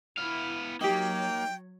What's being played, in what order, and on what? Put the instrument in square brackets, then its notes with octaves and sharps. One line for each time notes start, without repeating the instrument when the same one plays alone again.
[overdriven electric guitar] B3 F5 [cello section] E4
[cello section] F#3 C#5 [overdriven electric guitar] A#3 [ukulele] D#4 G4 [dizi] G5